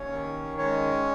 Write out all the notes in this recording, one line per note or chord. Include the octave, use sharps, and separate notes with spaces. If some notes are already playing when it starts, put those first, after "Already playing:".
Already playing: D#2 C#4 C#5
D#3
G#3 C#4 C#5